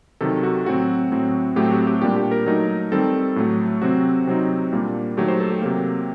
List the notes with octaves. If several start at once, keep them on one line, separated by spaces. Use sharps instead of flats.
C3 D#3 F#3 A4
F#4
A2 F#3 C4 F#4
A2 F#3 C4
A2 F#3 A3 C4 G4
F#4
G4
A#2 G3 A#3 D4 G4
G4
A#4
F#3 A3 D#4
D#3 G3 C4 A4
A2 F#3 A3
C3 F#3 C4 F#4
C3 F#3 C4 D#4
A#2 G3 A#3 D4
D#3 F#3 A3 G4
C5
A4
G4
C3 F#3 A#3